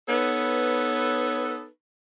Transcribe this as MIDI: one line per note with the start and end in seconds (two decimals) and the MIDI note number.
0.09 1.66 59
0.09 1.66 63
0.09 1.66 69
0.09 1.66 71
0.09 1.66 73